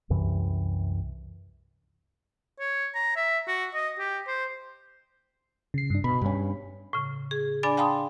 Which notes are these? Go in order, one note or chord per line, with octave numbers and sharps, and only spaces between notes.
C2 F#2 C3 E3
C#5
A#5
E5
F#4
D#5
G4
C5
C#3 C7
G2 D4
B2 B5
G2 C#4
A2 C#3
G#4
D4 D5 G#5 B5 A6
F5 G5 A5 B5 C6 D#6